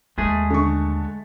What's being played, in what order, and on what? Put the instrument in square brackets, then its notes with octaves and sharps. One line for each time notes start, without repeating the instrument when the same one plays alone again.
[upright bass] D#2 [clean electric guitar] G#3 A3 G#4
[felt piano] D3 C#6